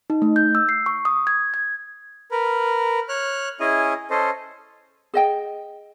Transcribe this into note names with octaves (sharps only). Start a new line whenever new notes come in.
D#4
A3
G6
E6
C7
C#6
D#6
G#6
G#6
A#4 B4
C#5 F6 F#6
C#4 E4 G#4 D#5 G#5
C#4 A4 C5 D#5
G#4 D#5 G5